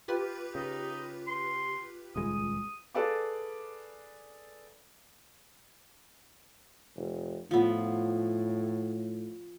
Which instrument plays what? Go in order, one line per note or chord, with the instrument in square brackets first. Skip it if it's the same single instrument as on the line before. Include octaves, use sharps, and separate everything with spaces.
[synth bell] F4 G4 B4
[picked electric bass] C#3 [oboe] D#4
[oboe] C6
[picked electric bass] D#1 C#2 G#3 [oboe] D#6
[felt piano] G#4 A4 B4 D5 F5 D6
[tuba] F1
[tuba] A2 [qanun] F3 B3